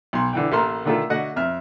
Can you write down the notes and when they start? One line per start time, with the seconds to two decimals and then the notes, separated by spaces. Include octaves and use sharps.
0.13 B1 C6
0.33 D3 E3 G5
0.52 A1 A#3 A4 A#4 C6 F6
0.85 D3 D#3 A3 F4 G#4 A4
1.10 D3 A3 F#4 D#5 F#5
1.36 F2 E5 F6